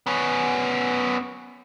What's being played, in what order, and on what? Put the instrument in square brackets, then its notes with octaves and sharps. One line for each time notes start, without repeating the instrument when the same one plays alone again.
[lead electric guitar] B3 C#4